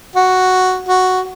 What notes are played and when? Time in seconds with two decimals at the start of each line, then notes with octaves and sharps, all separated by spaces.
0.16 F#4
0.89 F#4